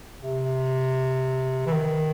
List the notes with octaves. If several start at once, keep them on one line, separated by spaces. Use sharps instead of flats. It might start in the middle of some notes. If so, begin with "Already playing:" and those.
C3
E3
D#3